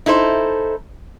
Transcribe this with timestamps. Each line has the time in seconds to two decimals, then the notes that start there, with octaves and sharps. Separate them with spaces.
0.06 D#4 E4 A4 C5